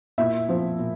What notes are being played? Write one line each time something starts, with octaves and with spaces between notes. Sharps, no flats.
A#2 E4 E5
F3 C4
A#2